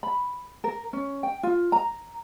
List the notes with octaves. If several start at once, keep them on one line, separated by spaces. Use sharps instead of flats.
B5
A#4
C#4
G5
F4
A#5